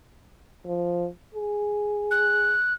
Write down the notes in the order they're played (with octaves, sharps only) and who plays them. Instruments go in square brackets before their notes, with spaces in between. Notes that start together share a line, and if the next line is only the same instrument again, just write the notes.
[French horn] F3
G#4
[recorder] F#6